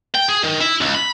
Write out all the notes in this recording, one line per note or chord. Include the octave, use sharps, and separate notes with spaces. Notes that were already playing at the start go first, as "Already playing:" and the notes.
G5
G#4
D#3
E4
C#2
B5